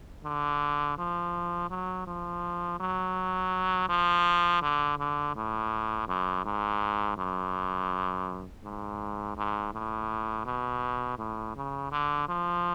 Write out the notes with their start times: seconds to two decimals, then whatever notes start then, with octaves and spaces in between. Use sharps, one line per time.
0.24 D3
0.98 F3
1.70 F#3
2.07 F3
2.80 F#3
3.89 F3
4.62 D3
4.98 D3
5.36 A2
6.08 F#2
6.45 G#2
7.17 F#2
8.64 G#2
9.37 G#2
9.73 A2
10.46 B2
11.18 A2
11.56 C#3
11.92 D3
12.28 F3